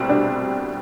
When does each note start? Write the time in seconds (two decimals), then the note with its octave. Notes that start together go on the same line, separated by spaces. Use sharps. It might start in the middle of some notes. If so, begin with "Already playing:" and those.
Already playing: C2 B2 G3 C4
0.10 D4